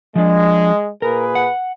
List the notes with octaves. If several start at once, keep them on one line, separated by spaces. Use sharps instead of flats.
F3 G#3 D4
A#2 G#4 A#4 B4
F#5